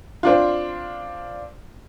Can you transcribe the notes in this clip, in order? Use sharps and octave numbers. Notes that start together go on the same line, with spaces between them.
C4 D4 F4